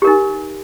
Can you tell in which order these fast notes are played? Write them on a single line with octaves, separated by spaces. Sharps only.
G4 A#4 D#4